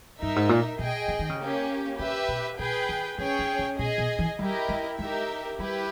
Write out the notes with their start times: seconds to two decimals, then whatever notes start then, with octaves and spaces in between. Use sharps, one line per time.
0.19 G2 D#4 A#4 E5
0.36 G#2
0.49 A#2
0.79 B2 G#4 D#5 G5
1.08 C#3
1.19 D#3
1.29 C#3
1.39 A#3 C#4 G4
1.99 C#3 G4 B4 E5
2.28 B2
2.59 B2 G#4 B4 G5
2.89 D#3
3.18 E3 C#4 G#4 C#5 G5
3.39 D#3
3.59 C#3
3.79 B2 G#4 D#5 G#5
3.98 B2
4.19 E3
4.39 G3 E4 G4 A#4 D#5
4.69 G#3
4.98 G#3 D#4 G4 A#4 E5
5.59 G3 E4 G4 B4